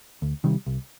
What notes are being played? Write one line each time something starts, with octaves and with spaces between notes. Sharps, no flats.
D2
C3 D#3 G3
C2